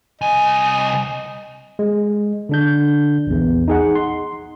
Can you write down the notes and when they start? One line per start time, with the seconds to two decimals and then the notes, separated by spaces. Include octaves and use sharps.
0.22 C2 D#5 G#5
1.79 G#3
2.49 D3 D4 G6
3.27 A#1 E2
3.68 D#4 G#4 F#5
3.95 C6